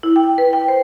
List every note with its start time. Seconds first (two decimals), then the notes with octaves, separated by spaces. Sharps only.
0.03 E4
0.16 G5
0.38 B4
0.53 G5
0.68 C5